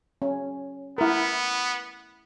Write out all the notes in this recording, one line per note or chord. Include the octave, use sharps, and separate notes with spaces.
C#4
B3 E4 A#4